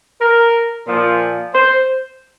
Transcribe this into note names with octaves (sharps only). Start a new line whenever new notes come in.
A#4
A#2 F3
C5